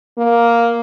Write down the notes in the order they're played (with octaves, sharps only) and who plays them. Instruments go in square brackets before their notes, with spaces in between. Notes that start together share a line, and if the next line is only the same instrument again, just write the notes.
[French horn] A#3